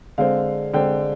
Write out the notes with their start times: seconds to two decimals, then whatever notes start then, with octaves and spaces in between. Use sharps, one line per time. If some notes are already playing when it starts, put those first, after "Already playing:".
0.18 D3 G#3 C4 F5
0.74 D3 G#3 C4 G5